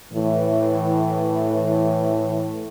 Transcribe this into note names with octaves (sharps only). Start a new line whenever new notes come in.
A2 E3